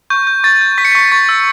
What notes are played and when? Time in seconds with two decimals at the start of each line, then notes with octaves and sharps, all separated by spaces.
0.10 C#6 G6
0.27 G6
0.44 C#6 A6
0.61 G6
0.78 C#6 B6
0.85 C#7
0.92 C#6 B6
1.12 C#6 A6
1.29 E6